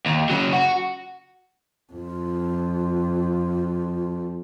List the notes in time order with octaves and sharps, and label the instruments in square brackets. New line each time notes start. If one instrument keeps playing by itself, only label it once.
[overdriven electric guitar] D#2
C#3 F#3
F#4
[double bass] F2 [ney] F4